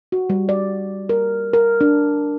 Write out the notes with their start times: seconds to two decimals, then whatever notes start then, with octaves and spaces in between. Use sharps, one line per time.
0.12 F#4
0.30 G3
0.49 D5
1.09 A#4
1.53 A#4
1.81 D4